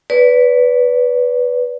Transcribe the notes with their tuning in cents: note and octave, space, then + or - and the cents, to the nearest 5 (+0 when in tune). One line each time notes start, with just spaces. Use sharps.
B4 +0 D5 -30